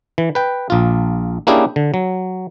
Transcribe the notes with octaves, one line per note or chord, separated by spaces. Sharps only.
E3
B4 G5
A#1 F4
A#3 C#4 D4 E4 G4 G#4
D3
F#3